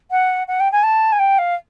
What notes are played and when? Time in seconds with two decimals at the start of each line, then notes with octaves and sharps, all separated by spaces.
0.11 F#5
0.48 F#5
0.60 G5
0.72 G#5
0.83 A5
1.12 G#5
1.19 G5
1.38 F5